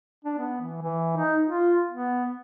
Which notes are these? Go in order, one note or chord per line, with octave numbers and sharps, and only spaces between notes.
D4
B3
E3
E3
D#4
F4
B3